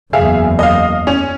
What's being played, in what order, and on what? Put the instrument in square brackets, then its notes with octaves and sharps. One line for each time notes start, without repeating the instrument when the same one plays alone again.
[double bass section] F#1 E2 [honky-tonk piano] G#4 E5 F5
[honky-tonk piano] D#5 F5
C#4 F7